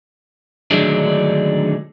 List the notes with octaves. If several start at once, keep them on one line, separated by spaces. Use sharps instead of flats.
D3 D#3 F#3 G#3 A3 D4